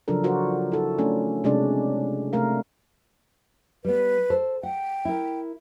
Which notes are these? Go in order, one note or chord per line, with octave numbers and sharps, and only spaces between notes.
C#3 F3 F#3 D4 A4 A#4
F4 F#4 A#4 C5 D5
E4 A4
A3 C#4 D4
C3 G#3 C#4 D4 D5
C3 A3 A#4 F5
G3 B3 B4
A4 C5
F#5 G5
E4 A#4